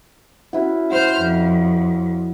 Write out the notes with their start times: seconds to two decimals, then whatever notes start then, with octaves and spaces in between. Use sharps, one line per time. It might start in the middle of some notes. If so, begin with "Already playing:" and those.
0.53 C#4 E4 F#4
0.91 C5 F#5 F6 G6
1.20 F2